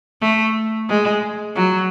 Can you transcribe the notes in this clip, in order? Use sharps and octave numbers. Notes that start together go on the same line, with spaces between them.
A3
G#3
F#3